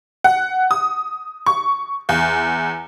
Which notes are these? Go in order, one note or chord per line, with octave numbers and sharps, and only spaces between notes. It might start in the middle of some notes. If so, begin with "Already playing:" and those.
F#5
D#6
C#6
E2